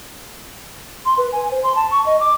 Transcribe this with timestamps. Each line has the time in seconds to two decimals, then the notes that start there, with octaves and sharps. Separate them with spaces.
1.05 C6
1.18 B4
1.33 G#5
1.51 C5
1.63 C6
1.76 A5
1.91 C#6
2.06 D#5
2.20 D6